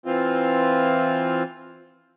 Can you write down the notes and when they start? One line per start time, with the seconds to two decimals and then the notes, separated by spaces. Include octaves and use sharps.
0.06 E3 C4 F4